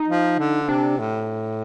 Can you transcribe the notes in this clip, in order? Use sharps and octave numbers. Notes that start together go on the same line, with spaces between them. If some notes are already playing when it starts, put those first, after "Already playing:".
Already playing: D#4
F3
D3
C3 D4
A2